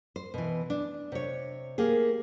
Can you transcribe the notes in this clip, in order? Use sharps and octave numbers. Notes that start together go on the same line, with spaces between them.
C5
B2 E3
D4
C3 C#5
A#3 G4 G#4